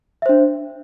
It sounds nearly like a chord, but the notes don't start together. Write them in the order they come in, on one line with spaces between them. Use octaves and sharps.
E5 C5 D4